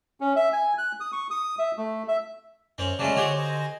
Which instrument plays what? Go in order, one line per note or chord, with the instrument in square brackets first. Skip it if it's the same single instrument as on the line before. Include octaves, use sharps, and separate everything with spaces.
[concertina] C#4
E5
G#5
F#6
D#6
C#6
D#6
E5
A3
E5
[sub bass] F#2 [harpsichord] C4 C#4
[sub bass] C#3 [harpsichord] F#3 G#3 A3 [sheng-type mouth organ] C#4 D5 A5
[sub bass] D3 [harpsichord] C4 F#4 G4 [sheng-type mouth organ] C#5 G#5
[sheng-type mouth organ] C5 D#5 G#5